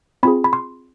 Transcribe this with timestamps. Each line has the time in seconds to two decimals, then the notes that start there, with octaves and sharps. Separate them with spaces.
0.23 C4 F4 G#4 B5
0.44 B5
0.53 C6